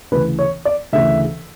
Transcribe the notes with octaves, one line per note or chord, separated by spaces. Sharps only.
D2 C#3 E3 B4
C#5
D5
D2 C#3 E3 E5